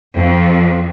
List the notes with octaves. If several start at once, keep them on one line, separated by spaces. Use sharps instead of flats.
F2